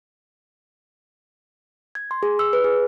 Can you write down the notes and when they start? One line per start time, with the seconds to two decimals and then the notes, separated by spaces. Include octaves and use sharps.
1.95 G#6
2.11 C6
2.23 G#4
2.39 E6
2.53 B4
2.64 G#4